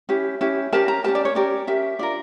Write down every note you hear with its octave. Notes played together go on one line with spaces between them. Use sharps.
C#4 E4 G4
C#4 E4 G4
C#4 G4 A#4 A5
A#5
C#4 G4 A#4 A5
D5
C#5
C#4 G4 A#4 D5
C#4 G4 A#4 E5
D4 F4 A#4 D5